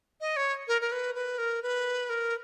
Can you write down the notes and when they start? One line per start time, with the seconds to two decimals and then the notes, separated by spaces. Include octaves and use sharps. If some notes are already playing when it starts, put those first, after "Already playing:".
0.21 D#5
0.36 C#5
0.68 A#4
0.81 A#4
0.92 B4
1.15 B4
1.38 A#4
1.63 B4
2.10 A#4